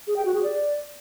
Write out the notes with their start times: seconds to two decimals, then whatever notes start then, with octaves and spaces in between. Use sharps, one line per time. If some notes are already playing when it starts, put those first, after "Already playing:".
0.07 G#4
0.16 G5
0.25 F#4
0.34 G#4
0.43 D5